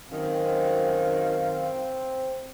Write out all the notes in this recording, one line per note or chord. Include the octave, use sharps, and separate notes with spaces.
F#2 D#3 C4 F5